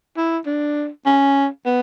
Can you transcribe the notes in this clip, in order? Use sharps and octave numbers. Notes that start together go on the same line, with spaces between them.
E4
D4
C#4
B3